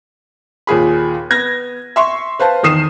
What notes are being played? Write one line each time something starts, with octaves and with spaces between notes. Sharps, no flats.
D#2 A#2 G#4 B5
B3 G#6 A#6
E5 C6 C#6
B4 C5 F5 A5
E2 D#3 D#6 C7 E7